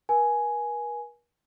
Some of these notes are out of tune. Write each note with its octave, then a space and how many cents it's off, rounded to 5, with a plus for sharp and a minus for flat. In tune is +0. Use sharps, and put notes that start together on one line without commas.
A#4 +45 G#5 +5